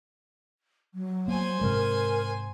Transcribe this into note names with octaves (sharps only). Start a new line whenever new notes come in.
F#3
A#3 C5 G#5
G#2 C3 G#3 A#4